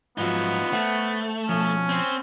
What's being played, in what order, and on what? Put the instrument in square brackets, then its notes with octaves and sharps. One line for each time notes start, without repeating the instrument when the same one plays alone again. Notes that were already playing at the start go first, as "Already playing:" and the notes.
[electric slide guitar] G#2 F3 F#3 [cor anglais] B3 [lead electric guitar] D#4 F4
[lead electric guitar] A3 [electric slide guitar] C5 E5 F#5
[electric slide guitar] B2 F3 [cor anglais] C#4
[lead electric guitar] C4